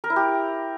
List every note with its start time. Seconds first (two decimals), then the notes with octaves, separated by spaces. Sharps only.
0.04 A#4
0.10 E4
0.16 G4